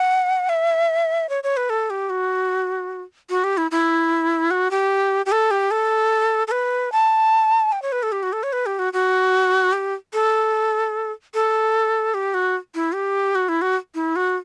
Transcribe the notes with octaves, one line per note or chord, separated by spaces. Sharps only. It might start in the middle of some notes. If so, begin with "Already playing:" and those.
Already playing: F#5
E5
C#5
C#5
B4
A4
G4
F#4
F#4
G4
E4
E4
F#4
G4
G4
A4
G4
A4
A4
B4
A5
G5
C#5
B4
A4
G4
F#4
A4
C#5
B4
G4
F#4
F#4
G4
A4
A4
G4
F#4
E4
G4
F#4
E4
F#4
E4
F#4